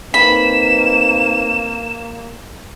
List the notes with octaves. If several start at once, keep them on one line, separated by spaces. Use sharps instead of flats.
A#3 C4 D#4 B4 B5 E7